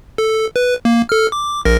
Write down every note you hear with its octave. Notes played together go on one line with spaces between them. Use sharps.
A4
B4
A#3
A4 F6
D6
A#1 A#4 A#6